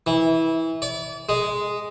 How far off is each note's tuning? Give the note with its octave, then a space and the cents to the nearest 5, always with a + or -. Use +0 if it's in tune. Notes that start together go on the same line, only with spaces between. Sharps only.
E3 -20
D5 -35
G#3 +0